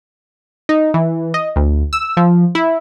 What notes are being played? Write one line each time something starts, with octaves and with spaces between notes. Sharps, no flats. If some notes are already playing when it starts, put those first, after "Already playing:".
D#4
E3
D#5
D2
E6
F3
E4